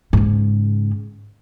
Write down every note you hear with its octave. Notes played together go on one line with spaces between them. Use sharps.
G#2 C#3